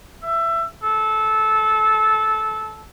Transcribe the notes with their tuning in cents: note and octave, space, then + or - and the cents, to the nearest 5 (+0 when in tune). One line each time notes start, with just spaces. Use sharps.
E5 +20
A4 -20